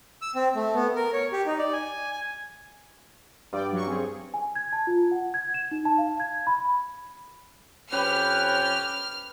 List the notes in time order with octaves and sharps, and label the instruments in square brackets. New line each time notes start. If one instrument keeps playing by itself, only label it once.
[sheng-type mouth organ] E6
C4
A3
B3
A#4
C#5
G4
D#4
D5
G#5
G#5
[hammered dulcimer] G2 [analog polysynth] D5 G5
[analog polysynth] F#3 C#6
C4 C#4 G#4
[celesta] G#5
G#6
A5
F4
F#5
G#6
E7
D#4
A5
F5
G#6
B5
[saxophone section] F2 C4 C#4 [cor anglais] G4 [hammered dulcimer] B4 G5 B5 [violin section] F6